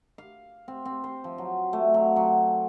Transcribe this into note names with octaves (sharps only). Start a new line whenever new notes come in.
F5
C4
C4
C5
F3
F#3
A3
F#3
F#3